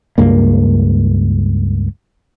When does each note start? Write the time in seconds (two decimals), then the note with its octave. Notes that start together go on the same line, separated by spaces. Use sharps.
0.18 C#2 G2 A#3